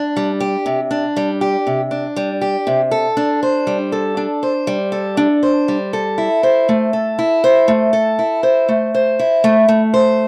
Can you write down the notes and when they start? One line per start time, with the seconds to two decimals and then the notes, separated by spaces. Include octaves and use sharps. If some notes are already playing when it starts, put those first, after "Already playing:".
Already playing: D4
0.17 G3
0.40 G4
0.66 C3
0.91 D4
1.17 G3
1.41 G4
1.67 C3
1.91 D4
2.16 G3
2.41 G4
2.67 C3
2.91 A4
3.17 D4
3.43 C5
3.67 G3
3.92 A4
4.17 D4
4.43 C5
4.67 G3
4.92 A4
5.17 D4
5.43 C5
5.68 G3
5.93 A4
6.18 E4
6.43 C5
6.69 A3
6.93 A4
7.19 E4
7.44 C5
7.68 A3
7.93 A4
8.19 E4
8.43 C5
8.69 A3
8.94 C5
9.19 E4
9.44 A3
9.69 A3
9.94 C5